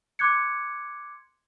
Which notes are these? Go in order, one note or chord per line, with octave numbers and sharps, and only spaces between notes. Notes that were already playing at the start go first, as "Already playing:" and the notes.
C6 D6 F#6 G#6 C#7